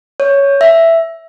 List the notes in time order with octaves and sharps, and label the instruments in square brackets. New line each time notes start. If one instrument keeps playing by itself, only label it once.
[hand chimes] C#5
E5